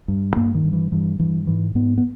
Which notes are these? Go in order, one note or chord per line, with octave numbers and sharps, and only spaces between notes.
G2
G2 A#3
D#3
G2
E3
G2 E3
G2 E3
G#2 E3
G#2 B3
B3